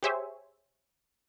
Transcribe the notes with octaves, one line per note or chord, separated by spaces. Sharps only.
G4 G#4 C5 C#5 E5 G#5